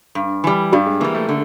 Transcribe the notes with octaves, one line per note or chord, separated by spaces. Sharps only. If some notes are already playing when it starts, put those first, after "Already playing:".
G2
E3 G3
G2 G3
G#3
E3 G3 A#3
A3
D3